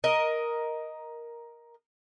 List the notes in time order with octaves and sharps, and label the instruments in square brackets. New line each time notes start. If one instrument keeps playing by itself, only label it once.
[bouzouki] A#4 D#5